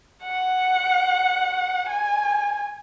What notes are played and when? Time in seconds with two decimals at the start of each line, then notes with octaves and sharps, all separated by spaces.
0.24 F#5
1.89 G#5